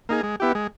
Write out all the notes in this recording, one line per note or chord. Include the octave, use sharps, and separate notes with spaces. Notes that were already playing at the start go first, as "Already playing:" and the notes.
A#3 D#4 G#4
G#3
B3 E4 G4
G#3